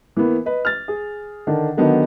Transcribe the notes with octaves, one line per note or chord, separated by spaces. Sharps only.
E3 A#3 B3
B4 D#5
F6 A6
G#4
D3 D#3 D4
D3 D#3 F#3 B3 D4 D#4